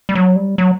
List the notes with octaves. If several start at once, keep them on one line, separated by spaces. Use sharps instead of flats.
G3
F#3
G3
F#3